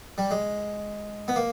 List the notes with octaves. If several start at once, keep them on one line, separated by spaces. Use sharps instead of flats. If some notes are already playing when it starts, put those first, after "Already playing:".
G3
G#3
B3
A#3